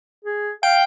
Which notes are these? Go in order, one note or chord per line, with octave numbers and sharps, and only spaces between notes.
G#4
F5 G5 D7